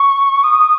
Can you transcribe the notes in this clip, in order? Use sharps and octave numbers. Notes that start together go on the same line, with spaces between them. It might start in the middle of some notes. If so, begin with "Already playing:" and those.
Already playing: C#6
D#6